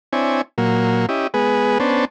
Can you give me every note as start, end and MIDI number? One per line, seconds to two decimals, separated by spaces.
0.13 0.41 60
0.13 0.41 62
0.13 0.41 64
0.13 0.41 73
0.13 0.41 80
0.58 1.06 46
0.58 1.06 54
0.58 1.06 58
1.09 1.27 61
1.09 1.27 64
1.09 1.27 67
1.09 1.27 75
1.34 1.78 56
1.34 1.78 59
1.34 1.78 68
1.34 1.78 71
1.80 2.05 59
1.80 2.05 61
1.80 2.05 62
1.80 2.05 72
1.80 2.05 81